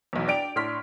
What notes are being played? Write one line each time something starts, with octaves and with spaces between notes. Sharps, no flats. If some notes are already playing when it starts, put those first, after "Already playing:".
B1 E2
D4 D5 G5 D7 F7
A2 D4 C6 F6 B6